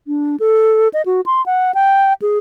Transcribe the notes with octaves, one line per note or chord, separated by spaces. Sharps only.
D4
A4
D#5
F#4
C6
F#5
G5
G#4